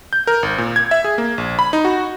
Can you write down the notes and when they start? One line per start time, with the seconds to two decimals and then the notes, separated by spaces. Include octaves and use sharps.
0.13 G6
0.27 A#4
0.43 G#1
0.58 A#2
0.76 G#6
0.91 E5
1.04 G#4
1.18 A#3
1.38 A#1
1.59 B5
1.73 D#4
1.85 F#4